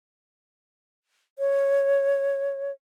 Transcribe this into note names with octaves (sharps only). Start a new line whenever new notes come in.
C#5